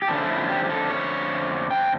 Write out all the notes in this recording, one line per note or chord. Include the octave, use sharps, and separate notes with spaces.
G4
F2 D3 A3 C#4 A4
E4
G4
G4
A4
C#5
G5